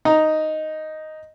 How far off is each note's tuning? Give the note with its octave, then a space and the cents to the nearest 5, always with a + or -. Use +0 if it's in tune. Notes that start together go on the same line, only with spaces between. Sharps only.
D#4 +0 A#5 +0